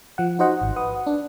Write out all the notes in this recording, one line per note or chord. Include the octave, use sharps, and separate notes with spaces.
F3 F#5
D#4 F#4 C5 D#5 F#5
G#1
B4 F#5 D#6
D4